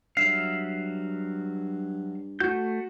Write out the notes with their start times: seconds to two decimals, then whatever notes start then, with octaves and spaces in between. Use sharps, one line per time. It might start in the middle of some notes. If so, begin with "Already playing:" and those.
0.17 G2 F#3 E5 F5 C7
2.40 A3 F#4 G6